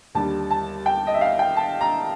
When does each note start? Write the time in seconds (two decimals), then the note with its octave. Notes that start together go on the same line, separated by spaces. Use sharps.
0.15 D#2 D3 G3 A5
0.51 A5
0.86 G5
1.07 D#5
1.14 E5
1.21 F5
1.39 G5
1.57 A5
1.81 A#5